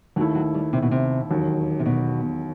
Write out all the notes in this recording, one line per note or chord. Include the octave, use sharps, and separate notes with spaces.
D#2 D#3 F#3 A3 E4
F#3
G3
C3
B2
C3
E1 D#2 D#3 F#3
C3
B2